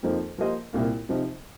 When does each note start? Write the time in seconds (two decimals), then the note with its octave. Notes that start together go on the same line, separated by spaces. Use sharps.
0.03 F2 F3 A#3 D#4
0.38 F3 A#3 G4 C5 D#5
0.73 C2 A#2 A#3
1.09 C3 F3 D#4 G4